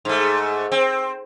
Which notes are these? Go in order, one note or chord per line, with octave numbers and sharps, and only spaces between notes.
G#2 A3
C4